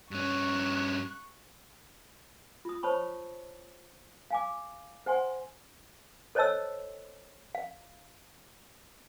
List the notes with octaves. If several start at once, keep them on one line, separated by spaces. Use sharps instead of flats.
G2 C#4 C#6 F#6
F4 D#6
C5 C#5 A5 B5 C#6
F5 G#5 D6
C5 F#5 G#5 C6
A4 C5 C#5 D#5 A5 E6
F5